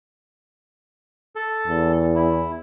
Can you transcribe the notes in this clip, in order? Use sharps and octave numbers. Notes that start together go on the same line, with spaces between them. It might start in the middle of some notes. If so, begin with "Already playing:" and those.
A4
E2
E4